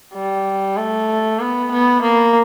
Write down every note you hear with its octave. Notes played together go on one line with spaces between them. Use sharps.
G3
A3
B3
B3
A#3